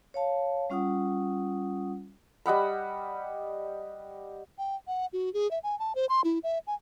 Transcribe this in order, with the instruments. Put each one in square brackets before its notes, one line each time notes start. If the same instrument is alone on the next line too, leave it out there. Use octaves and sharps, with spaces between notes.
[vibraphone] C#5 F5 A5
G3 C#4 F4 F#5 D#6
[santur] G3 D#5 F#5 B5
[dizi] G5
F#5
F#4
G#4
E5
G#5
A5
C5
C6
E4
E5
G#5